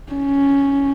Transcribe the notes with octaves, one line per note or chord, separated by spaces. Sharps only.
C#4